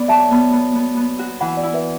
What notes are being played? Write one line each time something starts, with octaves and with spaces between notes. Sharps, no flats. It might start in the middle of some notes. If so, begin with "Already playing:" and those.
Already playing: B3 D5
F#3 E5 A5
B3
B3
B3
B3
F#4
E3 F#5 B5
D5 F#5
E4
B4 E5